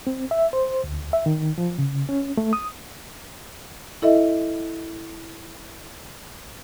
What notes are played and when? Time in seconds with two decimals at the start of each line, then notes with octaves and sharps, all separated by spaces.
0.07 C4
0.31 E5
0.53 C5
0.84 D2
1.13 E5
1.26 D#3
1.58 F3
1.78 C#3
2.09 C#4
2.37 A3
2.53 D#6
4.02 E4 A4 D#5 E5